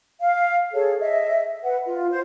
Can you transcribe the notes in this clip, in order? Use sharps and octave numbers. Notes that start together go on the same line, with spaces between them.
F5
G#4 A4 C#5
D#5 E5
B4 F#5
F4
C5